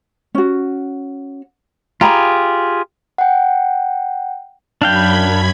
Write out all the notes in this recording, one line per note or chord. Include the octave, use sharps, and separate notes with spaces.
C#4 F#4
F4 G4 G#4 A#5 B5
F#5 G5
F#2 D4 F5 G5 B5 G#6